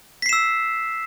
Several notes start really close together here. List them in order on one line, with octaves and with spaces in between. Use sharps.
B6 C7 E7 E6